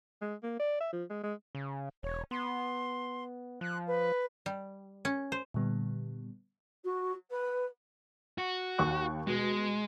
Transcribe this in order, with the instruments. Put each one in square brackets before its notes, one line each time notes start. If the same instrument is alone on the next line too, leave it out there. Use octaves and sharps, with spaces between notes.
[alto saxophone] G#3
A#3
D5
E5
F3
G#3
G#3
[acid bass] C#3
[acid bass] E1 [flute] C#5
[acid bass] B3 [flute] C6
[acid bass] F3 [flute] F#6
[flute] B4
[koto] G3
C#4
C5
[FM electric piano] A#2 D3 G3 B3
[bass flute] F#4
B4
[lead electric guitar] F#4
[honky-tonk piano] D#2 C#6 F#6
[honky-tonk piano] B2 [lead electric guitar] G#3